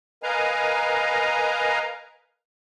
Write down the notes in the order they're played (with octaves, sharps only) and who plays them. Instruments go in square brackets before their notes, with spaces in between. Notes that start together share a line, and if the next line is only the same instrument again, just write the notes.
[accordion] A#4 B4 D#5 F5 G#5 A#5